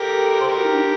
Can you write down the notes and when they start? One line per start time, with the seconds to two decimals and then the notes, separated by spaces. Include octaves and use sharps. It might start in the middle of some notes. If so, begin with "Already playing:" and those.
Already playing: G4 A4 A#4
0.40 C5
0.47 G4 A#4
0.57 F#4
0.65 D#4
0.75 D4